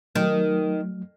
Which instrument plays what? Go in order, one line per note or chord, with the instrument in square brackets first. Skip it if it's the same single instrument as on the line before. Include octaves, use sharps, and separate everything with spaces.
[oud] D#3 [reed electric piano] F#3 A3